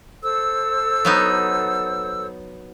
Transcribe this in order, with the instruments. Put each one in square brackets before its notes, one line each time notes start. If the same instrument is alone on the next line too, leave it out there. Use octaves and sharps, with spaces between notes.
[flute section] A4 C5 E6
[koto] F#3 B3 D#4